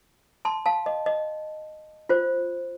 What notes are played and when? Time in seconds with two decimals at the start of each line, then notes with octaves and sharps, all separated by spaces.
0.45 A5 C6
0.66 F5 A5
0.86 D#5
1.06 D#5
2.09 F4 C5